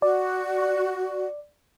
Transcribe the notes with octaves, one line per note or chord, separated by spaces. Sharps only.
F#4 D5